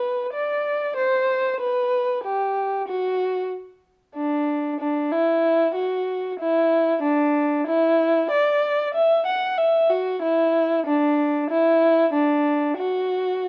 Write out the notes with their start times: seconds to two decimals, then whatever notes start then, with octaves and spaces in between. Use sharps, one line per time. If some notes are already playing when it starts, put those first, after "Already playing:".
Already playing: B4
0.33 D5
0.97 C5
1.61 B4
2.24 G4
2.88 F#4
4.16 D4
4.80 D4
5.12 E4
5.75 F#4
6.39 E4
7.03 D4
7.67 E4
8.31 D5
8.94 E5
9.26 F#5
9.58 E5
9.90 F#4
10.22 E4
10.86 D4
11.50 E4
12.14 D4
12.78 F#4